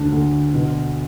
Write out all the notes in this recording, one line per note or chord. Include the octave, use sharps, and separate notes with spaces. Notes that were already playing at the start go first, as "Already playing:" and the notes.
Already playing: D2 D4
D2
B2